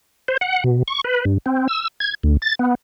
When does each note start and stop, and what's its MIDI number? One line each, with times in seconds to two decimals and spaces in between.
0.28 0.37 72
0.41 0.64 78
0.64 0.83 47
0.88 1.01 85
1.04 1.25 71
1.25 1.38 43
1.46 1.67 60
1.68 1.88 88
2.00 2.15 92
2.23 2.37 38
2.42 2.55 93
2.59 2.75 59